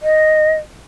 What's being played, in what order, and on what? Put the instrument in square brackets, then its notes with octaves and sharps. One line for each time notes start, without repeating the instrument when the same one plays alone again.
[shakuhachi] D#5